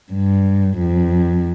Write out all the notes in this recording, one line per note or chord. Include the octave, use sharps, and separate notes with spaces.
G2
F2